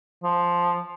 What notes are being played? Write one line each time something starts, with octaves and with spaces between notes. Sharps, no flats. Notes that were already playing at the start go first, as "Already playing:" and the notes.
F3